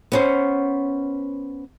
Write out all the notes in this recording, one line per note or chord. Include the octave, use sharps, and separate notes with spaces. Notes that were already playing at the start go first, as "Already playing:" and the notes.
B3 C#4 C5